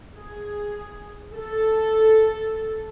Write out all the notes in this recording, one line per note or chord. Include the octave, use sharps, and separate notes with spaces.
G#4
A4